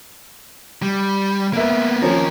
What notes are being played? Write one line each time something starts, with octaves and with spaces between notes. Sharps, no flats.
G3
A#3 B3 A#4 E5
D#2 F3 C4 C#4 A#4